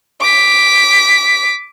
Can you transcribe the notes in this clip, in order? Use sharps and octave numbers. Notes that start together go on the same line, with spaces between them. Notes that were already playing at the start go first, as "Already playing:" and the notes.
D6 B6